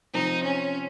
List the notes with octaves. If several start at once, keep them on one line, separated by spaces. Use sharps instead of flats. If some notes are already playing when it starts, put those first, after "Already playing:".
C3 F3 C4 D#4
C#4